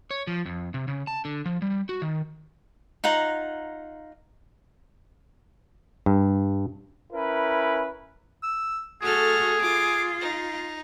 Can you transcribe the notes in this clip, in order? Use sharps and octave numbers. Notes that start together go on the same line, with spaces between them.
C#5
F3
F2
C3
C#3
A5
D3
F3
G3
F#4
D#3
D#4 F4 F#5 A#5
G2
C#4 E4 A#4 B4
E6
A3 F#4 G#4 A4 F6
F4 D6
D#4